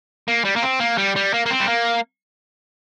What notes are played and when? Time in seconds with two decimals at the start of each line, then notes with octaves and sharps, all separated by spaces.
0.28 A#3
0.45 G3
0.56 A#3
0.63 C4
0.80 A#3
0.98 G3
1.16 G3
1.33 A#3
1.46 A#3
1.50 C4
1.60 G3
1.68 A#3